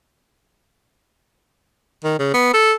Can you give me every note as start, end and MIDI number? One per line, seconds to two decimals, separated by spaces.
2.04 2.14 51
2.19 2.33 49
2.34 2.51 59
2.54 2.73 69